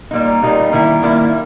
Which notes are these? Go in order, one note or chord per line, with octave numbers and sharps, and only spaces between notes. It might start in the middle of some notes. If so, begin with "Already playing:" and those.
A#2 G3 A#3 D#4
A#2 G3 A#3 D#4
D#3 G3 A#3 E4
D#3 G3 A#3 E4